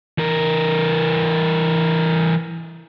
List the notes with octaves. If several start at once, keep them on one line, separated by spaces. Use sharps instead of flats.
E3 A#4